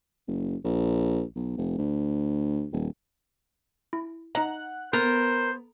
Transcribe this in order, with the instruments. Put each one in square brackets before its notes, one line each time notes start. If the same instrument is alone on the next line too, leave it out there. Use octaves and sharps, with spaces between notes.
[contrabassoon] F#1
A#1
B1
F1
D2
D#1
[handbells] E4
[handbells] D#4 D#5 A#5 [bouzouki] F#5
[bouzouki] B3 [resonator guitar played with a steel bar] A#4 [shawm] C5 [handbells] F#6